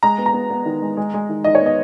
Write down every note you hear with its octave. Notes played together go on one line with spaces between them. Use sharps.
G#3 A#5
B3
A#5
B3
B3
D#3
G#3
G#3
G#3
D#3
D#3 D#5
C#5
B3 D#5